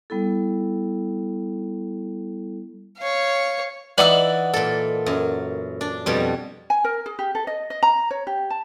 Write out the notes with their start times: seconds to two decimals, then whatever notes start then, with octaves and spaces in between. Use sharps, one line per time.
0.10 G3 B3 E4 A4
2.98 C#5 F5
3.98 E3 D#4 D5 F#5 E6
4.53 A#2 A4
5.06 F#2
5.81 D4
6.06 F2 B2 G3
6.70 G#5
6.84 A#4
7.06 G#4
7.19 G4
7.35 A4
7.47 D#5
7.70 D#5
7.83 A#5
8.11 C#5
8.27 G4
8.50 A5